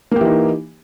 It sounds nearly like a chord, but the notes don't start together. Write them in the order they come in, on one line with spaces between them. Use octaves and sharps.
A#3 G4 E3 D#4